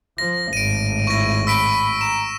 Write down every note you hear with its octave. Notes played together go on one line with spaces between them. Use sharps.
F3 A#6
G#1 A2 D7 D#7
E4 C#6 A#6
B5 E6 B6 D7
A#5 E7